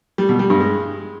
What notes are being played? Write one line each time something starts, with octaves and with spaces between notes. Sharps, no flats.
G3
B2
G3
G2
G#3